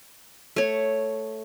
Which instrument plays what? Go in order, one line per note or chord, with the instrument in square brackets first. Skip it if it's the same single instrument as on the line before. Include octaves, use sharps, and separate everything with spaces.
[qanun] A3 C#5